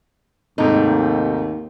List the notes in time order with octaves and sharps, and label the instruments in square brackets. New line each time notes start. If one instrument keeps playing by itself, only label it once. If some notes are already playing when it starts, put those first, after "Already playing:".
[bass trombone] D#2 [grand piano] G#2 C3 A3 [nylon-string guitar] D#4